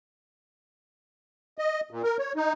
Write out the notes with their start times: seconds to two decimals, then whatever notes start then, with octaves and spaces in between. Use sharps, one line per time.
1.58 D#5
1.91 A#2
2.03 A#4
2.18 C#5
2.36 D#4